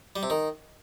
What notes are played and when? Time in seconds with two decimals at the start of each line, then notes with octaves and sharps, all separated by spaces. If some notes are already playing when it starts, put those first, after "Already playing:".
0.16 G3
0.23 C3
0.30 D#3